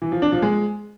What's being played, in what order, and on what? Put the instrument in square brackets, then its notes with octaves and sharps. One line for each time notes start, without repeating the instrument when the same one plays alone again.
[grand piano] E3
F3
D4
F3
G#3